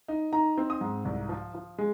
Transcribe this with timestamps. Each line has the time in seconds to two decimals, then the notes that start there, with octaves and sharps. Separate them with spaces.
0.08 D#4
0.33 D#4 A#5
0.58 C4
0.70 D#6
0.81 G#2
1.05 C2
1.29 F3
1.55 F3
1.78 G#3